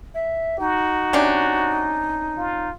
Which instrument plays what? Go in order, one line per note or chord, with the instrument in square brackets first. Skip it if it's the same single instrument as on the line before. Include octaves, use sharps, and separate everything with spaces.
[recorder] E5
[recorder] D#4 [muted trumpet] F#4
[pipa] C3 C#4 D4
[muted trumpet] F4